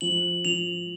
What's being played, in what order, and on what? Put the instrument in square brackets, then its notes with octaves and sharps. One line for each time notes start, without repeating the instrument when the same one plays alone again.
[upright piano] F3 [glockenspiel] F#7
[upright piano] F3 [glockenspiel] F7